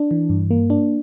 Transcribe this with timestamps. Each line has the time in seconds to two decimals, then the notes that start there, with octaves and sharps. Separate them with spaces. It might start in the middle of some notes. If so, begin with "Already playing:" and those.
Already playing: D4
0.11 E3
0.30 G2
0.51 A#3
0.70 D4